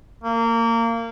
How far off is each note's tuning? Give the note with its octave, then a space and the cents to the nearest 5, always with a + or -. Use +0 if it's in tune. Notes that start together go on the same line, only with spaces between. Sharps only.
A#3 -25